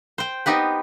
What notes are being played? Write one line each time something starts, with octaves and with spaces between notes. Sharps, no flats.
C5 G5
B3 C4 D#4 G4 B4